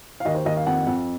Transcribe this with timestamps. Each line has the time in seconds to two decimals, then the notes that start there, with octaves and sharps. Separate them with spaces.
0.20 F5
0.25 D#2 D#5
0.35 C5
0.45 D#2 D#5
0.56 F5
0.67 F2 F#5
0.87 F2